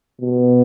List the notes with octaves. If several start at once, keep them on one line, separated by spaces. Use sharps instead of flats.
B2